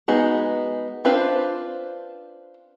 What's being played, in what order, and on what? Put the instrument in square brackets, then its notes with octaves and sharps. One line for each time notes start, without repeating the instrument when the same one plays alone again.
[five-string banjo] G#3 B3 D#4 F#4 G#4
C4 D4 F4 B4 C5